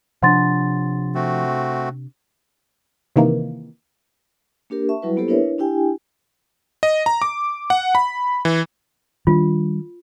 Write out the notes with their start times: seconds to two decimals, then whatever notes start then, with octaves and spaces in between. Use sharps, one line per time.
0.23 C3 F3 C#4 D4 F#5 C6 A6
1.15 A3 C4 F#4
3.16 C3 D#3 E3 A#3
4.70 A#3 D4 G4 A#4
4.89 E5 A5 C#6
5.02 F#3 G3 E4 F#4 B4
5.17 A#3 B3 E4 G4 A4 C5
5.28 D4 E4 A#4 B4 C#5 E5
5.58 D4 E4 G4 G5 G#5
6.83 D#5
7.06 A#5
7.22 D6
7.70 F#5
7.95 B5
8.45 E3
9.27 D#3 G3 D4 F4